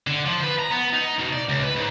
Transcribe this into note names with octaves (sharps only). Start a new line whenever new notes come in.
D3
F3
B4
A#5
B3
D#4
B2
D5
C#2
B4
G#2